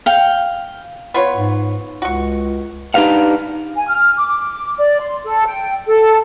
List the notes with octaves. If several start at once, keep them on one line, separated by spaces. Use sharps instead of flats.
F5 G5
B3 F4 C#5
G#2
C#2 F#4 C#6
D4 D#4 G4 B4 F5 F#5
G#5
F6
D6
D6
D5
C6
A4
G5
A4